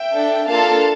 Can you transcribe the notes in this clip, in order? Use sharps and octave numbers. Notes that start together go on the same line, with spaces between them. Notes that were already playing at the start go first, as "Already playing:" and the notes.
Already playing: E5 G5
D4 A4
A#3 D4 F4 A4 F5 A5